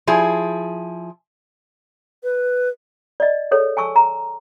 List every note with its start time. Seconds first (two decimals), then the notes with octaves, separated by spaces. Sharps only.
0.07 F3 E4 G#4
2.23 B4
3.20 D5 D#5
3.51 G#4 A4 C#5
3.77 G#5 A5 C#6 E6
3.96 A#5